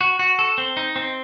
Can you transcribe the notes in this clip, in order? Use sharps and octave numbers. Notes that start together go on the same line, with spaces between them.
F#4
F#4
A4
C4
D#4
C4